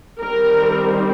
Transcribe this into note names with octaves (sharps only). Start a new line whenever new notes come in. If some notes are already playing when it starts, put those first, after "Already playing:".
D#3 G3 C4 A#4